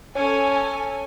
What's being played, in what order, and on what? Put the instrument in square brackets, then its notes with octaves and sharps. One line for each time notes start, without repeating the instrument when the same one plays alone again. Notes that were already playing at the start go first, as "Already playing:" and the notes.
[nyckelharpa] C#4 [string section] A4 G#5 [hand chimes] C#5